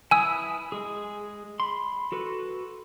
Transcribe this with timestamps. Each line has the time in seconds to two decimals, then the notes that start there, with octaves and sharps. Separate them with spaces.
0.11 E4 B4 G#5 D#6 E6
0.72 G#3 G#4
1.60 B5 C6
2.12 F#4 A4 B4